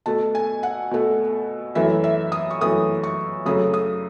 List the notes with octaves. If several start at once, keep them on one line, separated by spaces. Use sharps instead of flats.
B2 A3 A5
G#5
F#5
B2 A3
F#2 E3 A3 E5
E5
D#6
C#6
F#2 E3 A3 D#6
C#6
F#2 C#3 F#3 A3 D#6
D#6